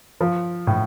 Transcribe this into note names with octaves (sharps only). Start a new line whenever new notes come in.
F3
A2